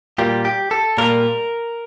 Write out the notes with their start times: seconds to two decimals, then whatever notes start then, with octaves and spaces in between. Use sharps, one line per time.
0.18 A#2 G3 A#3 F4 G4
0.45 G4
0.71 A4
0.98 A#2 G3 A#3 F4 A#4